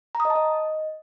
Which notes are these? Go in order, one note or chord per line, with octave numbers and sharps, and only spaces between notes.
A#5
D#6
D#5
A5
D#5